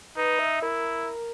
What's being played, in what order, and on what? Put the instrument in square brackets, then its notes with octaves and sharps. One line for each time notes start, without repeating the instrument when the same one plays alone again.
[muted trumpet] D#4 [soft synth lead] B4
[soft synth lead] E5
[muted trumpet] E4 [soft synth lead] A#4